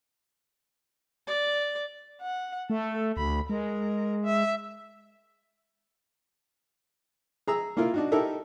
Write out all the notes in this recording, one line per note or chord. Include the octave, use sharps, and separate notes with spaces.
D5
F#5
A3 A4
D2 B5
G#3 A#4
E5
G#4 A#5 E6
A#3 E4 F4 A#4
D4 D#4 F#4
D#4 E4 G4 A4 A#4 E5